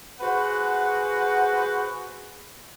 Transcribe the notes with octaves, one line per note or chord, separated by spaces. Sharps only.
F#4 G#4 B4 C5 F#5